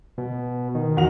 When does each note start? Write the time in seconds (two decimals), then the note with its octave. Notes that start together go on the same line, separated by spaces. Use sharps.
0.18 B2
0.75 D#3
0.96 E2 F#4 F7